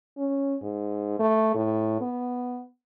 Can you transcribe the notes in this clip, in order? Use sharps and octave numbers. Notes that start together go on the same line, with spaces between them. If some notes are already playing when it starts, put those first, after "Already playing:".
C#4
G#2
A3
A2
B3